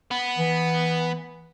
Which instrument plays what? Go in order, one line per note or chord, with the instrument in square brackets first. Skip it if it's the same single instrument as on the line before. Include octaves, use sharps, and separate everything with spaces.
[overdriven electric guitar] B3
[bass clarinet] E3